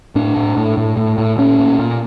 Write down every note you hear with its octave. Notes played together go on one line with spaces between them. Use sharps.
A2 D4
A2
A2
A2
A2
A2
A#2 C#4
A#2
A#2